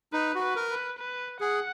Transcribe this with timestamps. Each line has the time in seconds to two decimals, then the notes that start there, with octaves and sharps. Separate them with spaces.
0.13 D#4 B4
0.35 F#4
0.42 B4
0.56 A#4
0.70 B4
0.98 B4
1.40 G#4 F#5